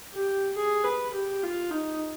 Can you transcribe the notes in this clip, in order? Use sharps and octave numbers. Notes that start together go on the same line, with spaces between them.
G4
G#4
B4
G4
F4
D#4